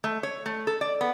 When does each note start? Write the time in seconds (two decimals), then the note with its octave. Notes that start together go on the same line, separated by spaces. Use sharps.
0.04 A3
0.23 C#5
0.46 A3
0.67 A4
0.81 D5
1.01 B3